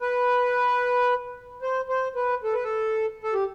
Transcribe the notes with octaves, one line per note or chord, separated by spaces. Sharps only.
B4
C5
C5
B4
A4
B4
A4
A4
G4